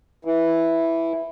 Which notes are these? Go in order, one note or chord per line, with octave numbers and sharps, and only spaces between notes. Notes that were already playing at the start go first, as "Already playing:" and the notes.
E3